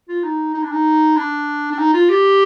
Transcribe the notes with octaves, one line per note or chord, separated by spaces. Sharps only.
F4
D#4
D#4
D4
D#4
D4
D4
D#4
F4
G4